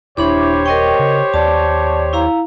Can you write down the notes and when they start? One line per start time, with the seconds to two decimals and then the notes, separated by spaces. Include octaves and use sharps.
0.17 D#1 D4 E4 G4 C5 C#5 B5 D6
0.66 A#4 D#5 G5 C#6
0.99 C#3
1.34 D#2 D5 A5
2.13 E4 F5 A#5